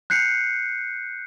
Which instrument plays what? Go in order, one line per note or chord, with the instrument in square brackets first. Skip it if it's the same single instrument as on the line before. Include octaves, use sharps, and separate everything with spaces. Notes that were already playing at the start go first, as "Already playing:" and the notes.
[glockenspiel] F#6 G6 C7 C#7